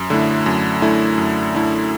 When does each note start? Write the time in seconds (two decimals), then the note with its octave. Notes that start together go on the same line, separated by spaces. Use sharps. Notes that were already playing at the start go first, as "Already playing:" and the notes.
Already playing: F#2
0.10 D3 A3 E4
0.46 F#2
0.82 D3 A3 E4
1.18 F#2
1.54 D3 A3 E4